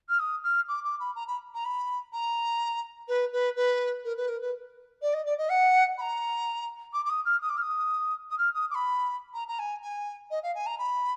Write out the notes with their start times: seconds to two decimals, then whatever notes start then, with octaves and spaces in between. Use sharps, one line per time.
0.08 F6
0.19 D#6
0.43 F6
0.68 D6
0.84 D6
0.99 B5
1.15 A#5
1.27 B5
1.54 A#5
1.64 B5
2.12 A#5
3.08 B4
3.32 B4
3.56 B4
4.04 A#4
4.17 B4
4.28 A#4
4.41 B4
5.01 D5
5.13 D#5
5.25 D5
5.37 D#5
5.49 F#5
5.97 B5
6.01 A#5
6.93 D6
7.05 D6
7.09 D#6
7.25 F6
7.41 D#6
7.49 D6
7.57 F6
7.62 D#6
8.30 D#6
8.38 F6
8.54 D#6
8.70 D6
8.74 B5
9.34 A#5
9.48 A#5
9.59 G#5
9.82 G#5
10.30 D#5
10.43 F5
10.55 G#5
10.66 A#5
10.78 B5